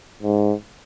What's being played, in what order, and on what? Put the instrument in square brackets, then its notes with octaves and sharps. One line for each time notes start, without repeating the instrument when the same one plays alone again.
[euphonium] G#2